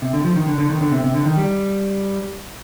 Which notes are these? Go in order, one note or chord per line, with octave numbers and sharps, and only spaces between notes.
C3
D3
F3
D#3
D3
D3
D#3
D3
C3
C3
D3
D#3
G3